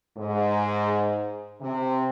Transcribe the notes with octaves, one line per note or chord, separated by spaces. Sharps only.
G#2
C3